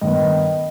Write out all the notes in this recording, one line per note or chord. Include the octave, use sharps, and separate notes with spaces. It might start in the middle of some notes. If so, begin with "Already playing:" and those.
G2 D#3 B3 D#5